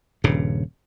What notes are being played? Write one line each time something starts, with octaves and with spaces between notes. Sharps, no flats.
D#1 G2 C#3